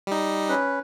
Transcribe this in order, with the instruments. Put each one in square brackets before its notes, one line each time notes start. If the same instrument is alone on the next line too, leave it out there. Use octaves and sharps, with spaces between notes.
[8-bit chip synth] G3 D#4
[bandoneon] C#4 B4